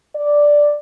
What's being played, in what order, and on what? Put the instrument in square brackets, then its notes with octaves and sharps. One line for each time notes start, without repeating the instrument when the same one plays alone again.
[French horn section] D5